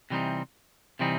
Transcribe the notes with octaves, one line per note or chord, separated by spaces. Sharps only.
C3 E3 G3 C4 D#4
C3 E3 G3 C4 D#4